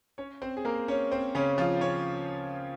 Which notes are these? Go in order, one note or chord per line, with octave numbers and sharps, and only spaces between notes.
C#4 C#5
C4 C5
G#4
A#3 A#4
C#4 C#5
C4 C5
C#3 C#4
F3 F4
C#4 C#5